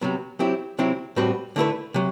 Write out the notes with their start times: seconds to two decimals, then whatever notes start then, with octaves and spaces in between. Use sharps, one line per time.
0.01 C3 F#3 B3
0.39 F#3 C4 E4 G4
0.79 C3 F#3 C4 E4
1.16 A2 G3 C4 F#4 B4
1.56 D3 A3 E4 B4
1.94 C3 F#3